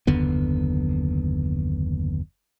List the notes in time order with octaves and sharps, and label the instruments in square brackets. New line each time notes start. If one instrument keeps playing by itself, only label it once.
[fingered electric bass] F#1 D#2 D3 B3